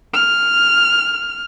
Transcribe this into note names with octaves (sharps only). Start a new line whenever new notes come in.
F6